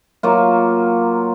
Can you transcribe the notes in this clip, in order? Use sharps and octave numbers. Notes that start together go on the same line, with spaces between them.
F#3 A#3 F4